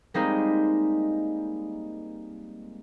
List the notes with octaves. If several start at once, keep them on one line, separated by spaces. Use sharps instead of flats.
G3 G#3 A#3 C4 D#4